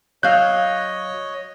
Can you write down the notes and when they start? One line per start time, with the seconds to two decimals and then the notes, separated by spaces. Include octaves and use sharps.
0.23 F#3 C#5 D#5 F5 F#6 G6